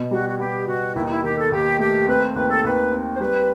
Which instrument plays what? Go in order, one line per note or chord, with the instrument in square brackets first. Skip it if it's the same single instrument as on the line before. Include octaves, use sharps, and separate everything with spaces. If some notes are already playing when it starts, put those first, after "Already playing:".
Already playing: [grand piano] B2 B3
[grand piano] G3 [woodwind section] F#4
[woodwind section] F#4
[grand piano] B3 [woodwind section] G4
[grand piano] B2 [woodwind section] F#4
[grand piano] D#2 [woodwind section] E4
[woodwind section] D#4
E4
[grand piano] D#3 [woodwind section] G4
[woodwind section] A4
[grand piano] D#2 [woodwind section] G4
[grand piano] A3 [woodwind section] G4
[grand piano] C4 [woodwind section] B4
[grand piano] D#2 [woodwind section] B4
[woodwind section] A4
[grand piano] D#2 [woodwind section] B4
[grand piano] C4
[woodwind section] C5
[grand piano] G3 [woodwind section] B4